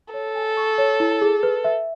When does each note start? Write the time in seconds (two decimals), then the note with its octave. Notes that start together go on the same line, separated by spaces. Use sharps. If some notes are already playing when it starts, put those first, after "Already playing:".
0.14 A4 C#5
0.35 G#5
0.57 C#6
0.78 C#5
1.00 E4
1.22 G#4
1.43 B4
1.64 E5